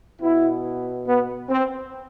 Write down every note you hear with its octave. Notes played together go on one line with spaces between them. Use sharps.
B2 B3 E4
B3
C4